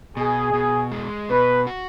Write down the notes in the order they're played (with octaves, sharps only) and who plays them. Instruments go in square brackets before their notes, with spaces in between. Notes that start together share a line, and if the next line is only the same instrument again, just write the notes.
[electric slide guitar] B2 [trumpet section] G#4
[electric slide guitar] B2
G#3
[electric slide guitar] B2 [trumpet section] B4
[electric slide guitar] F#4